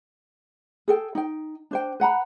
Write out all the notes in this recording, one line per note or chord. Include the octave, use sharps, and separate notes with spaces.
G#4 A4 G5
D#4 G5
D4 C5 G5
B4 F#5 A#5 B5